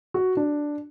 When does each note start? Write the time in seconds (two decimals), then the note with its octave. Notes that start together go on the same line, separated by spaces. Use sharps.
0.14 F#4
0.37 D4